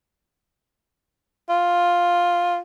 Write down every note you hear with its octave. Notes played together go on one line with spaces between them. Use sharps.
F4